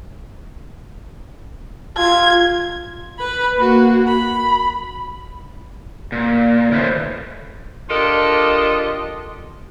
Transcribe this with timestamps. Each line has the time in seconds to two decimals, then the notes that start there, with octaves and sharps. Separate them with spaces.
1.98 F4 G#6
3.19 B4 B5
3.58 A#3 F#4
4.08 B5
6.12 A#2
6.72 D#3 F3 A3 C#4 B4 C5
7.90 D4 F4 G4 A4 A#4 D#5